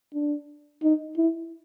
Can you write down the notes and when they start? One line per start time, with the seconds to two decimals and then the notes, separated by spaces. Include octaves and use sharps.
0.14 D4
0.83 D#4
1.17 E4